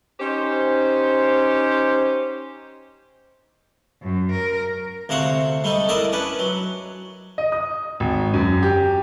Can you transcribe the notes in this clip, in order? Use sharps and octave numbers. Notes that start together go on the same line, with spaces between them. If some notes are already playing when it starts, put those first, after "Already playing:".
C#4 D#4 G4 C5
F#2
A#4
D2 C3 F5 F#5 C#6
G3 A3 D#4
D4 E4 A#4 D5 D#5
C#4 D4 B4
F#3
D#5
D#6
G#1
F#2
G4